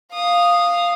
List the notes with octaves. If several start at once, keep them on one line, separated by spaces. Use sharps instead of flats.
F5 D#6